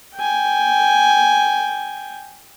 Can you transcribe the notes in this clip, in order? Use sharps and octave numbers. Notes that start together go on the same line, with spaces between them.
G5 G#5